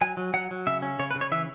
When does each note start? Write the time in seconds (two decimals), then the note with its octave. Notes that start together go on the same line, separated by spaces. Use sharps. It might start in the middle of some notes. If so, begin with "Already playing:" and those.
0.01 F#3 G#5
0.17 F#3
0.34 F#3 F#5
0.51 F#3
0.67 C#3 E5
0.82 C#4
0.99 C#3 C#5
1.11 B4
1.15 C#3
1.21 C#5
1.32 E3 E5